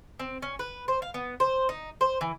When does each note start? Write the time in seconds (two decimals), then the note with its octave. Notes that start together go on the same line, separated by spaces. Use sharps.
0.19 C4
0.42 C#4
0.59 B4
0.88 C5
1.02 F5
1.14 B3
1.40 C5
1.69 D#4
2.01 C5
2.21 E3